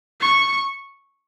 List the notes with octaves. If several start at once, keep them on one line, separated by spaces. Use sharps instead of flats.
C#6